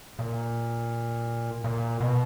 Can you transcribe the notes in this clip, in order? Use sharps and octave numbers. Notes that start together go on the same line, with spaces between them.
A#2
A#2
B2